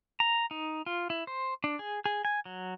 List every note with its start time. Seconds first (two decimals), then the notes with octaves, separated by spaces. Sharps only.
0.20 A#5
0.51 D#4
0.86 F4
1.10 E4
1.27 C5
1.64 D4
1.79 G#4
2.06 G#4
2.25 G#5
2.45 F#3